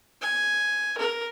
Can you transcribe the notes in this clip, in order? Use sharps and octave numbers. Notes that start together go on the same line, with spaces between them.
G#5
A#4